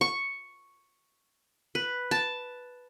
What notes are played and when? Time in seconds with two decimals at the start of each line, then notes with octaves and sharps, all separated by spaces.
0.01 C#6
1.75 B4
2.11 A5